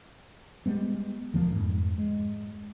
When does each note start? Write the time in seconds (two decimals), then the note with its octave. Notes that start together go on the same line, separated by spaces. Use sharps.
0.66 G3 G#3 B3
1.34 E1 D2 F3 A#3
1.53 F2 G#2
1.98 G#3